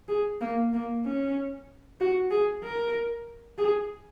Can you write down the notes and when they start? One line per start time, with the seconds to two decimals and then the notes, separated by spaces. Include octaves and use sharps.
0.08 G#4
0.41 A#3
0.73 A#3
1.05 C#4
2.00 F#4
2.31 G#4
2.64 A#4
3.58 G#4